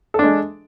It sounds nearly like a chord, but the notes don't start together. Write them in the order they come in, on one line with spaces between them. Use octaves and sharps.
A4 D4 G#3